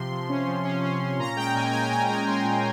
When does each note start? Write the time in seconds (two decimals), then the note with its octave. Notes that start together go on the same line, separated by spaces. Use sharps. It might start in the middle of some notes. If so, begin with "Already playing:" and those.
Already playing: C3 F3 C6
0.11 F3
0.29 C#4
0.48 F3
0.65 C#4
0.83 C#4
1.02 C#4
1.19 A#2 A#5
1.37 G#3 G5
1.55 A#2 G#5
1.64 G5
1.73 G#3 G#5
1.82 G5
1.91 A#2 G#5
2.09 G#3 A#5
2.27 G#3 C6
2.44 A#2